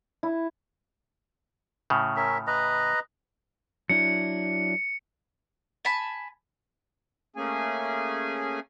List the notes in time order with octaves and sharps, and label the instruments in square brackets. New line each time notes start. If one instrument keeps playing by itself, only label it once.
[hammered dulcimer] E4
[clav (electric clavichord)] A2 C#3
[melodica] C#4 A#4 E5
B4 D#5 A#5
[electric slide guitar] F#3 D4 E4 [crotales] C#7
[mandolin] G#5 A5 B5
[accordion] A3 A#3 C#4 G#4 G#5